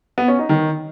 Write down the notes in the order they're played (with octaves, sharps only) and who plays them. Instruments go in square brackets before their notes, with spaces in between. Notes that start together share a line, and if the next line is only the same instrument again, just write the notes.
[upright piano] B3
C#4
D#4
D#3